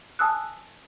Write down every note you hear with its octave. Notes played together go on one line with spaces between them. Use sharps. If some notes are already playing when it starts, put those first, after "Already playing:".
G#5 A5 D#6 E6 F#6